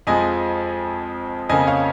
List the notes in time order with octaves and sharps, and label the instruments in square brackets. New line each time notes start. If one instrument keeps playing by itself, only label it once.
[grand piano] F2 F3 G#3 D#5 G#5
F2 C#3 A#3 D#5 G#5
C#5 F5